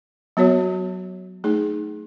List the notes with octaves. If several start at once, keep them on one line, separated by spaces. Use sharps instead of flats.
F#3 B3 F#4 C#5
A3 D#4 G#4